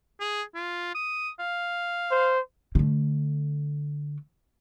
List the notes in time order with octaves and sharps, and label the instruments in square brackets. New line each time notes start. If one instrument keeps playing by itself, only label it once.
[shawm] G#4
F4
D#6
F5
[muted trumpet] C5
[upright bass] D3 A3